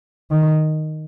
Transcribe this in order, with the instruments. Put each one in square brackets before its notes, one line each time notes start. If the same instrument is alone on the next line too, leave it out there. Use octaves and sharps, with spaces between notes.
[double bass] D#3